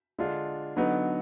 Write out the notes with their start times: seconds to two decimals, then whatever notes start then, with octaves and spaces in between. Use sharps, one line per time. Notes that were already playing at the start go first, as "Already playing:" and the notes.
0.19 D3 G#3 D4 F4
0.76 D3 F#3 B3 D#4